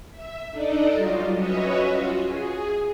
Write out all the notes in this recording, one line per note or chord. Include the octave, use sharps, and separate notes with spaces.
E5
D4 D#4 A4 D5 D#5
F#3 G3 F4
C#4 F#4 B4 C#5 D#5 E5
F4 F#4
G#4